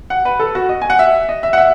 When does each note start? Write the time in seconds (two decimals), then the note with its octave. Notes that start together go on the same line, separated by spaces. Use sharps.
0.10 F#5
0.25 B4
0.39 A4
0.55 F#4
0.69 D#5
0.82 G#5
0.90 F#5
0.99 E5
1.29 D#5
1.43 E5
1.53 F#5
1.58 E5